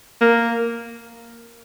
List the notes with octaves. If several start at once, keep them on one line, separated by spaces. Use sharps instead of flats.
A#3